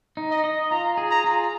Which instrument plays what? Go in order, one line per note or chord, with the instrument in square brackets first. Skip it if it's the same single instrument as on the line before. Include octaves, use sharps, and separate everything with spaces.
[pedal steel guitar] D#4
[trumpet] D#5
[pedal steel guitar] D#5
[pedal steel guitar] F4 [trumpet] A#5
[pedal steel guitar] G#4
[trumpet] A#5
[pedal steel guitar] F4